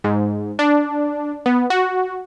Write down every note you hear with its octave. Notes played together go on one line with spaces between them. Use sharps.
G#2
D4
B3
F#4